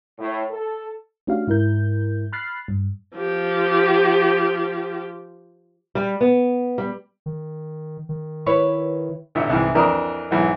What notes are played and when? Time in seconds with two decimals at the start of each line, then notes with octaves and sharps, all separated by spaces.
0.19 A2
0.50 A4
1.27 A3 C#4 D4 F#4 G4 F5
1.47 G#2 E4 A#4 G6
2.33 B5 F6 F#6 A6 C7
2.68 G2
3.17 F3 G4
5.95 G3
6.21 B3
6.78 G3
7.26 D#3
8.09 D#3
8.46 E4 B4 C#5
9.35 G#1 A#2 D3 E5
9.49 C2 G#2 E3
9.75 F2 E3 D4 A#4 D#6
10.31 B1 G#2 E3 F#3